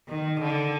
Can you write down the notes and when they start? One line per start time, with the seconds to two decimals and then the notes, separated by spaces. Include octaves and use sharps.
0.08 D#3
0.40 D3